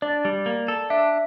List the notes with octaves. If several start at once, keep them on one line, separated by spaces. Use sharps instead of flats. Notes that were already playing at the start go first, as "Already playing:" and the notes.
D4 D5
G3
A#3
A4
D4 E5